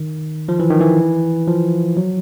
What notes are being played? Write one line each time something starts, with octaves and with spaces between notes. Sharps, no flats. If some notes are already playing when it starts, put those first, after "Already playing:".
Already playing: D#3
F3
E3
D#3
E3
F3
F#3